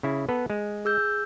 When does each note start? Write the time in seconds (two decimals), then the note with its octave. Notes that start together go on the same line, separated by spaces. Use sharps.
0.03 C#3 E4
0.29 B3 A4 B4
0.50 G#3
0.85 G#4 E6 G6